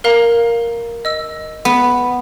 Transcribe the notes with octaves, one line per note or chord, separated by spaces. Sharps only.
A#4 F5 A#5
D#5 E6
B3